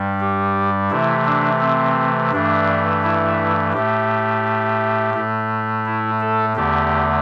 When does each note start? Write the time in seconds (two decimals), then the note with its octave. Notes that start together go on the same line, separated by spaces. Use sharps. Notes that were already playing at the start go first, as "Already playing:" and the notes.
Already playing: G2 G3
0.21 G4
0.90 C3 E3 A3 E4
1.26 D4
1.61 C4
2.32 G2 E3 A3 D4
3.03 E4
3.73 A2 A3 G4
5.14 A2 A3
5.86 E4
6.21 A4
6.56 E2 D3 A3 G4